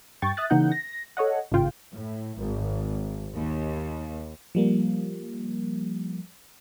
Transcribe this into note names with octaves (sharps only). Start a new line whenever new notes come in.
G2 G5 C#6 A6
E5 D#6 F#6 A6
C#3 E3 A#3 D#4 F#5 G6
A#6
A4 C#5 D#5 F#5
A1 G#2 C#3 F4 G5
A2
G#1
D#2
F3 G3 A#3